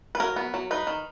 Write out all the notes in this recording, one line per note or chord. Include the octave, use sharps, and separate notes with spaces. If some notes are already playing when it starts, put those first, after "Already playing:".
B4
F#3 A#4
B3
F#3
D#4 B4
D#3